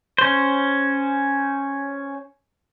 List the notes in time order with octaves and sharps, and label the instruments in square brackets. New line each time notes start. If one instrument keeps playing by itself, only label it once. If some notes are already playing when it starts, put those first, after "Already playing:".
[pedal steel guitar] C#4 C5